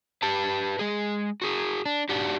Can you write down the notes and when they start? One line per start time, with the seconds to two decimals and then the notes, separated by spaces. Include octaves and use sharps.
0.22 G4 B4 A5
0.79 G#3 G#4
1.42 F#4 G#4
1.86 D4
2.09 D4 D#4 F#4 G4